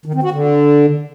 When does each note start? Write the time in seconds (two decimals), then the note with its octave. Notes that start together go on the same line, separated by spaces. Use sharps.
0.06 D#3
0.14 C4
0.23 F#4
0.32 D3